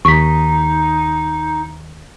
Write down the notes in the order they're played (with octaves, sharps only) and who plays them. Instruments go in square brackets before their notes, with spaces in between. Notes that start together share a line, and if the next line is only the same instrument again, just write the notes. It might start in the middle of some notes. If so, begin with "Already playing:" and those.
[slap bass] D#2 [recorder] D#4 [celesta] C#6 B6